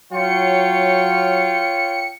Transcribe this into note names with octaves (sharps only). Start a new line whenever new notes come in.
F#3 F4 C#5 G5 C#7